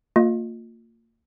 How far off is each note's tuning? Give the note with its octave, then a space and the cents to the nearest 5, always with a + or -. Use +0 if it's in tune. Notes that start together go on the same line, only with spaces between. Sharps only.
A#3 -35 F4 +25 D#5 +0